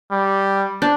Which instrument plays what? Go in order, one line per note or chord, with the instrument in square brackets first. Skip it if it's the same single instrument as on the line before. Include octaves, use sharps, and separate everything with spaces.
[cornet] G3
[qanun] D4